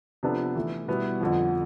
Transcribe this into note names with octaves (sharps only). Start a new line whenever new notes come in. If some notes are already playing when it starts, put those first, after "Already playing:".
C3 F3 B3 D4 A4
E3 A3 E4
B2 G3 B3 E4
F2 D3 F3